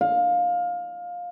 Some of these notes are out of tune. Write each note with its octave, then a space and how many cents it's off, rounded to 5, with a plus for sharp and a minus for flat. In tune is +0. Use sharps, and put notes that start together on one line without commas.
F5 +20